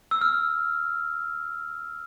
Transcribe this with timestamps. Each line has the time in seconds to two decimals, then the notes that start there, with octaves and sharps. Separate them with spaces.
0.11 E6
0.21 F6